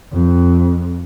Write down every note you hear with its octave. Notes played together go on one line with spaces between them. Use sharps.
F2